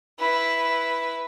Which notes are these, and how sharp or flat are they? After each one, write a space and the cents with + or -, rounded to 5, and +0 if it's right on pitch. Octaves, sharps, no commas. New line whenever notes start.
E4 +0 B4 +0